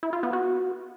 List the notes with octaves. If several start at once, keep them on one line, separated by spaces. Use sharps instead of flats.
E4
F4
B3
F#4